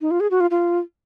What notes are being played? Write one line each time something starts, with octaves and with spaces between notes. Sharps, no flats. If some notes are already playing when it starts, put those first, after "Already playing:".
D#4
F4
G#4
F#4
F4
F4